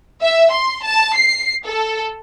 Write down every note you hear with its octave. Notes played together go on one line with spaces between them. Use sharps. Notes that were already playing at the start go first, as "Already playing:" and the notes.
E5
C6
A5
C7
A4